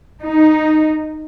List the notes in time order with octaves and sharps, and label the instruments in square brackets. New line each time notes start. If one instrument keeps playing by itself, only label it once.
[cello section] D#4